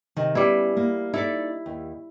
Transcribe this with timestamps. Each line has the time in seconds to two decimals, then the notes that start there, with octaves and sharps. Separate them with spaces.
0.16 C3 D#3
0.35 G3 B3 C#4 E4
0.77 A#3
1.14 D#4 E4 A4 D5
1.66 D#2